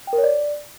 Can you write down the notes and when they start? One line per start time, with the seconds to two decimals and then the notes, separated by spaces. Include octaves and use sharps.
0.07 G5
0.13 A#4
0.18 C#5
0.24 D5